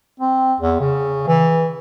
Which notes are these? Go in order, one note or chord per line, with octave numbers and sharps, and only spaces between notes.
C4
E2
C#3
E3